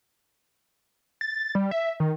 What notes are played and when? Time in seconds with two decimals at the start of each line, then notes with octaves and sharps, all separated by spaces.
1.21 A6
1.55 G3
1.71 E5
2.00 D#3